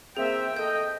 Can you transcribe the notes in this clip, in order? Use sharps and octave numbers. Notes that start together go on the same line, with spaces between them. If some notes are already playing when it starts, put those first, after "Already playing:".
A#3 C4 G#4 E5 G5
A4 D#5 G6